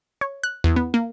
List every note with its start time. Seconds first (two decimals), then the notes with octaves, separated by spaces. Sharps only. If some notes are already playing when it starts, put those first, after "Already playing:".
0.21 C#5
0.44 F#6
0.64 E2
0.76 B3
0.94 A#3